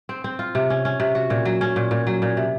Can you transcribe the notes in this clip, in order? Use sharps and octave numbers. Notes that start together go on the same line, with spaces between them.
C4
C4
F4
C3
C#4
C#4
C3
F#4
A#2
F#3
C#4
A#2
A#2
F#3
A#2
C3